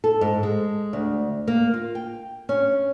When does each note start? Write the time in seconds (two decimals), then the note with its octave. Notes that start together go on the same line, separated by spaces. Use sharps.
0.04 A4
0.21 G#2
0.43 G#3
0.93 D2
1.48 A#3
1.74 F4
1.95 G5
2.49 C#4